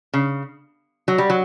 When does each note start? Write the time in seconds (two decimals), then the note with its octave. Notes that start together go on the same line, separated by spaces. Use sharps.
0.14 C#3
1.08 F#3
1.18 G3
1.30 F#3